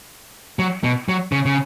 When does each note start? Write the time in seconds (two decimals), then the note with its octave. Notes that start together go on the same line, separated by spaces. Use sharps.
0.59 F#3
0.84 B2
1.09 F#3
1.32 C#3
1.45 C#3